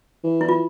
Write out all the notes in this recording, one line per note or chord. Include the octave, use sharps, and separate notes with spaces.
E3
E4
F4